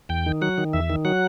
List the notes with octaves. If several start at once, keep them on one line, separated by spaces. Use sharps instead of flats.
E2 G5
D#3
F#3 F#5
D#3
E2 E5
D#3
F#3 F#5